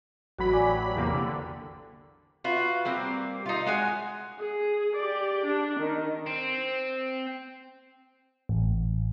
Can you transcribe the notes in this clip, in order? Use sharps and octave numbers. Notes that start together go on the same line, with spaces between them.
A1 F#3 F#4 B5
D5 G#5 D6
G5 D6
E2 C3 A#3
D3
F4 F#4 B4
G3 A#3 C4
D#4 F4
G#3 F#4 G#5
G#4
G4 D5
D4
D#3
C4
A1